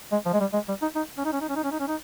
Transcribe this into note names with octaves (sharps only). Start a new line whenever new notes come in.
G#3
F3
G#3
G3
G#3
G3
D#4
D#4
C#4
D#4
C#4
D#4
C#4
D#4
C#4
D#4
C#4
D#4